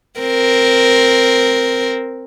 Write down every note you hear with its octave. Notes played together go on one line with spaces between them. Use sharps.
C4 A#4